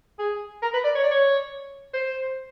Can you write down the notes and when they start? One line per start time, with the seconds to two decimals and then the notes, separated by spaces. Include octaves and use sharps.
0.19 G#4
0.62 A#4
0.73 B4
0.84 D5
0.95 C#5
1.04 D5
1.11 C#5
1.93 C5